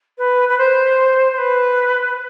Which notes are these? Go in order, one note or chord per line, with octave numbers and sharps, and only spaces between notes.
B4
B4
C5
C5
B4